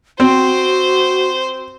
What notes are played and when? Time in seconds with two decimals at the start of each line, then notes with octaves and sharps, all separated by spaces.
0.20 C4 F#4 C5